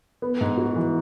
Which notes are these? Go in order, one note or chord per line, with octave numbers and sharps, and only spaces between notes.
B3
G#2
F#4
E3